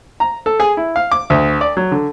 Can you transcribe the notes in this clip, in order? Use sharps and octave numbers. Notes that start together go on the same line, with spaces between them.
A#5
A4
G#4
E4
F5
D6
D2
D5
F#3
D3